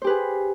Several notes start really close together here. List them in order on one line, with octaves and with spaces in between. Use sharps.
C5 G4 B4 G#4